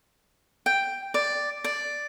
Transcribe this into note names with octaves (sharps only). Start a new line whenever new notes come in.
G5
D5
D5